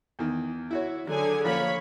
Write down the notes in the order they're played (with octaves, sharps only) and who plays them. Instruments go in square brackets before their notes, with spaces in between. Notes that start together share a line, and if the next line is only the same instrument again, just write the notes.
[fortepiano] E2 D#3
E4 F#4 C#5
[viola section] D3 G#4 G#5 [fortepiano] F#3
[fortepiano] F3 A#3 C#4 [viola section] C#5 B5